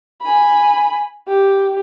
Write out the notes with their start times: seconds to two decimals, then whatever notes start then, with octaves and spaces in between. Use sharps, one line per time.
0.22 G#5 B5
1.28 G4